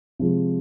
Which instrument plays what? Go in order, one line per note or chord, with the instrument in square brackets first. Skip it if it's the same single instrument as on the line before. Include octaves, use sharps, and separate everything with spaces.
[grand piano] C3 F3 G#3